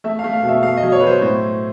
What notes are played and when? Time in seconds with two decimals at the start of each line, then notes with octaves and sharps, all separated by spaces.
0.04 A3 E5
0.19 F5
0.24 A3
0.33 F5
0.43 B2
0.48 E5
0.63 A3 F5
0.77 D#5
0.83 F#3
0.92 C#5
1.00 B4
1.03 F#3 C5
1.22 A2 C5